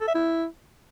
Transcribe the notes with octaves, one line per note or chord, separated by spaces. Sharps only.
A4
E5
E4